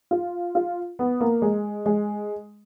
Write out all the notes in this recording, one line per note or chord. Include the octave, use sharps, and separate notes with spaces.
F4
F4
B3
A#3
G#3
G#3